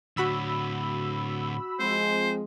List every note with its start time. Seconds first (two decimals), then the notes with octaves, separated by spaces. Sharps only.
0.17 A2 D3 F#4 B5 E6
1.80 F3 G#3 C4 C5